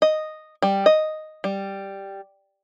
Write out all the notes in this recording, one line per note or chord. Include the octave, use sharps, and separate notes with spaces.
D#5
G3
D#5
G3